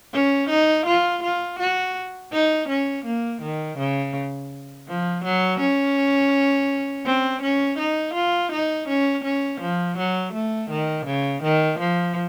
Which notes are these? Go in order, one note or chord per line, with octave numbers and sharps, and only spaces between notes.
C#4
D#4
F4
F4
F#4
D#4
C#4
A#3
D#3
C#3
F3
F#3
C#4
C4
C#4
D#4
F4
D#4
C#4
C#4
F3
F#3
A3
D#3
C#3
D#3
F3